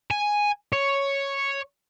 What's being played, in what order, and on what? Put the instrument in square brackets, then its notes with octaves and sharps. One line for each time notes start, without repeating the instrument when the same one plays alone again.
[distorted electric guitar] G#5
C#5